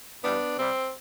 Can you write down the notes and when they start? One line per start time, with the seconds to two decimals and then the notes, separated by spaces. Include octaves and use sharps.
0.22 G2 E3 G3 B3 D4
0.56 C3 G3 C4